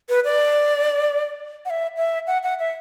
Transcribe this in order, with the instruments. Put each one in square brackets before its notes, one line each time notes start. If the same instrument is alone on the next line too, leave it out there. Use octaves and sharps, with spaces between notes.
[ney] B4
D5
F#5
E5
E5
F#5
F#5
E5